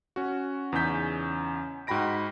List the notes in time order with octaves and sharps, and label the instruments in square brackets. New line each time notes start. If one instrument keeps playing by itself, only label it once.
[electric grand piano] C#4 F#4
E2 C#3 C#4 D#4 G6 B6
G#2 F#4 G5 B5 A#6 D7